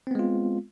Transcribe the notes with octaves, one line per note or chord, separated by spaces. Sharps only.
G#3 B3 C4 F4